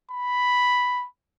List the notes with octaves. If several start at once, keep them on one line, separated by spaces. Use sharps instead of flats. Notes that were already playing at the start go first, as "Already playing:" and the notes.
B5